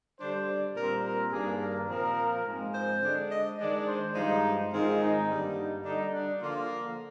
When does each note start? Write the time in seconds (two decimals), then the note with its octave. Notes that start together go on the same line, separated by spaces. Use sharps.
0.20 D3 G3 D4 C5
0.48 D5
0.76 A#2 G3 C4 A#4
1.05 A#4
1.32 G2 D#3 A#3 D4 G#4
1.60 A#4
1.88 A#2 F3 C4 A#4
2.46 G#2 F3 G#3 C4
2.74 C5
3.02 D3 G#3 D4
3.30 D#5
3.59 D#3 G#3 D4 D5
3.87 C5
4.15 G2 F3 G#3 D#4
4.71 G#2 D#3 G#3 C4 F4
5.00 D#4
5.29 G2 D3 G3 A#3
5.57 D#4
5.84 D3 G3 D4 D#4
6.13 D4
6.41 D3 F3 A#3 F4